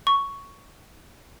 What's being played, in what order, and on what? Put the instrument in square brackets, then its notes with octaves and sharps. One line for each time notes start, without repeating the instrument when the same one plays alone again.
[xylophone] C#6